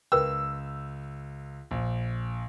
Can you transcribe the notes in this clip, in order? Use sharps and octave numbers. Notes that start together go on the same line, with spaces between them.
C#2 A#4 B4 G5 E6
A#1